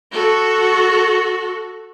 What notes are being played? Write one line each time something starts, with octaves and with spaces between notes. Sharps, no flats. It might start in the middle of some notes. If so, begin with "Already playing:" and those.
F#4 A4